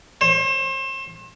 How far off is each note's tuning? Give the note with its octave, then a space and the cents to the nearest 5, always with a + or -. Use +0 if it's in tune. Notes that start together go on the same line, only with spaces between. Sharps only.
C5 +35